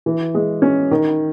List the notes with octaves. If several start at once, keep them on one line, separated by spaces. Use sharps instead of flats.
E3
G#3
C#4
D#3